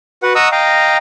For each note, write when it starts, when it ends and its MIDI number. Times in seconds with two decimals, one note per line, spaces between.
0.23 0.33 66
0.23 0.33 71
0.23 0.33 78
0.35 0.48 75
0.35 0.48 78
0.35 0.48 82
0.35 0.48 85
0.35 0.48 87
0.35 0.48 88
0.52 0.97 75
0.52 0.97 77
0.52 0.97 79
0.52 0.97 82